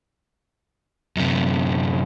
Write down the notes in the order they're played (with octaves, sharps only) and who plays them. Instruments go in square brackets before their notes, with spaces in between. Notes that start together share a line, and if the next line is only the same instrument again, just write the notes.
[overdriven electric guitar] F#2 C3